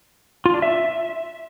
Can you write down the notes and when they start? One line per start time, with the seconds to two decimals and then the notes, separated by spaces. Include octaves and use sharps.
0.46 F4
0.54 D4
0.62 E5